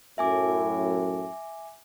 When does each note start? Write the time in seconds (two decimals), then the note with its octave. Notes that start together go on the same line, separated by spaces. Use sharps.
0.18 F#2 A2 E5 G#5 D6